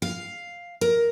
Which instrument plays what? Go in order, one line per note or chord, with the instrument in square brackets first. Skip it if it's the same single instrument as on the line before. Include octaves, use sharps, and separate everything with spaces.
[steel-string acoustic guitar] F5
A#4